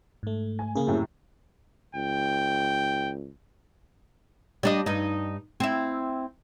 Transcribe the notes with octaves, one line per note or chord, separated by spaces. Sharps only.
G#2 A3
G#5
C#3 A#3 G#4
F#2 A2 C3
C#2 G5
G3 D4 D#5
G2 D#4
C4 E4